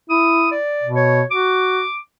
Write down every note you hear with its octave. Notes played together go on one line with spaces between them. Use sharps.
E4 D#6
D5
B2
C#5
F#4 D6